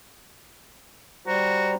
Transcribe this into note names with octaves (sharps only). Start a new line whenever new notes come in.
G3 F#4 C5 A#5